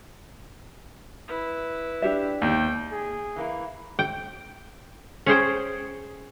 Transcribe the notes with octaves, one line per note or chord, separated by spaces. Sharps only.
E4 B4
D4 G4 E5
D#2 G5
G#4
E3 A#3 E4
G5
C#4 G#4 C5 G5